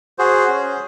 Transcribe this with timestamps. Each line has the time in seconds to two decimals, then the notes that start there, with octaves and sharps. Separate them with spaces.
0.19 F#4 G#4 C5
0.48 C#4